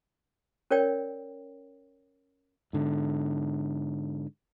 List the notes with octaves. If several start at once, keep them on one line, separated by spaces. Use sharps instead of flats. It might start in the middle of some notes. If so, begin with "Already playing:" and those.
C#4 A#4 C#5 D5 G5
G#2 D3